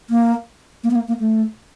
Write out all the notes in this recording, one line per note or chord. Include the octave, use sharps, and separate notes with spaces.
A#3
A#3
B3
A#3
A#3
A3